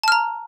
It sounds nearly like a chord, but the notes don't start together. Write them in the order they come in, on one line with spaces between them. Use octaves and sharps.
A5 F6 A#5